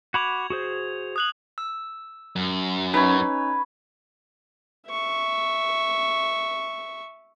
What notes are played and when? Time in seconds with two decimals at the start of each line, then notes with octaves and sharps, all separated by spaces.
0.14 F#4 B5 D6 G#6 F7
0.50 F#4 G#4 C5
1.16 D#6 F#6 F#7
1.58 E6
2.36 F#2
2.94 C#4 D#4 B4 C#5
4.88 E5 C#6